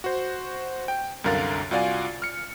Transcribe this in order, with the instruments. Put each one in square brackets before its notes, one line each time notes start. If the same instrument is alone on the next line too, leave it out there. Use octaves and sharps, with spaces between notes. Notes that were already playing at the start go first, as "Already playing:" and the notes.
[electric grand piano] F#4 C5
G5
C2 F#2 D3 A#4 F5 A6
C2 F4 F#4 D5 F5 G#5
F6 C#7